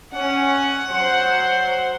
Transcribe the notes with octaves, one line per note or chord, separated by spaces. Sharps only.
C#4 F#5
F#3 C5